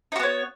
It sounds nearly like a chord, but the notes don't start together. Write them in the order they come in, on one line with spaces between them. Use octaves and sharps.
D#4 F#4 B3 C#5